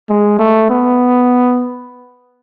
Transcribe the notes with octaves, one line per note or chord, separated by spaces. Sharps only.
G#3
A3
B3